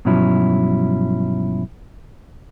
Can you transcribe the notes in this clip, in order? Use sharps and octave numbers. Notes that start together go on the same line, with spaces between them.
G2 B2 F3 F#3 C#4 E4